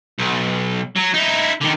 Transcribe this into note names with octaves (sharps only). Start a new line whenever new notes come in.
B1
F#3
D#4 E4
D3 D#3